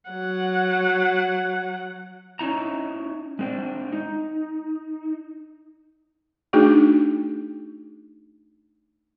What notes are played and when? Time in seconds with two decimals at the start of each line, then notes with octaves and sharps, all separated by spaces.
0.10 F#3 F#5
2.39 C#4 D#4 E4 A#5
3.39 G#3 C4 D4
3.92 D#4
6.53 A3 D4 D#4 F#4 G#4